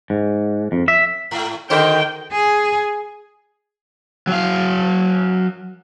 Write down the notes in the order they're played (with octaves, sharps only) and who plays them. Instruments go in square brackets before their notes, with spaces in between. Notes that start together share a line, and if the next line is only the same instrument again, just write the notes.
[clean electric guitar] G#2
F2
E5
[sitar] G#2
[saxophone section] D3 D#3 [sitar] G#3 F#4 C5 [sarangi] G5
[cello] G#4
[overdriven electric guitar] F#3 F5